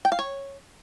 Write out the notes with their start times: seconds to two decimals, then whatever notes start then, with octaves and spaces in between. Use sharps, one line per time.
0.05 G5
0.12 F5
0.19 C#5